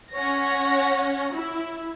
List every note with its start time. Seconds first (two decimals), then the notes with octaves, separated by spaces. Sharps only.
0.12 C#4 C#5 F#5 A#6
1.33 E4